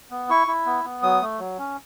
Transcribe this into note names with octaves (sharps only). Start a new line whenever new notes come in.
B3
E4 C#6
E4
B3
B3
F#3 D#6
A3
F#3
C#4